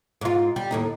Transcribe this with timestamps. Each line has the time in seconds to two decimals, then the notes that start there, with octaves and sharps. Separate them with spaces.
0.21 G#2 F4
0.56 G3
0.71 D#2 A2 D#4